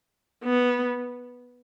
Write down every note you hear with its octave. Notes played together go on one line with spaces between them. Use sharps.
B3